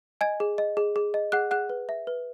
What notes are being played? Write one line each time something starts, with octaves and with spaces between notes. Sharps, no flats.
D#5 G#5 G#6
G#4
D#5
G#4
G#4
D#5
G#4 F#5 F#6
G#4 F#5 F#6
B4
E5
B4